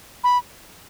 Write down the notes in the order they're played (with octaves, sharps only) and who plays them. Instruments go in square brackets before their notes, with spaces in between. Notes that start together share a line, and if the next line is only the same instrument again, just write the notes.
[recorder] B5